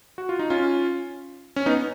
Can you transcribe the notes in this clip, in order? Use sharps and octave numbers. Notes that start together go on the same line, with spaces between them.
F#4
F4
D#4
C#4 F4
C#4
B3 D#4